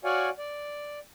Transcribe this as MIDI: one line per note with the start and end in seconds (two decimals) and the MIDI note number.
0.04 0.29 66
0.04 0.29 73
0.04 0.29 74
0.04 0.29 77
0.04 0.29 78
0.04 0.29 80
0.39 0.99 74